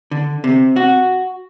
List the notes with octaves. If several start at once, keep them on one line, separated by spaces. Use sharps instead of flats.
D3
C3
F#4